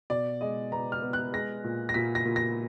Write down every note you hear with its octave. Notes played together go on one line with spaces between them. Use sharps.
B2 D5
G#3 D#5
B3 A#5
F6
B3
F#6
G#3 A#6
A#2
A#6
A#2 B6
A#6
A#2
A#6